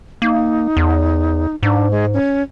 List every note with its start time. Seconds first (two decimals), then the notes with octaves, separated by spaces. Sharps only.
0.22 A#3 D#4
0.77 E2
1.63 G#2 D4
1.91 G#3
2.14 C#4